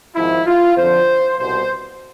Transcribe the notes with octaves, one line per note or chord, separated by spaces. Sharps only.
G#1 G#2 F3 E4
F4
F2 D3 F3 C5
C2 B2 C5